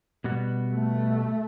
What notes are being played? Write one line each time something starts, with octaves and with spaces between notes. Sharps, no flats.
B2 G3 B3 F#4
A3